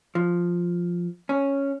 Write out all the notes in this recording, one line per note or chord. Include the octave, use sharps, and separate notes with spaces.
F3
C#4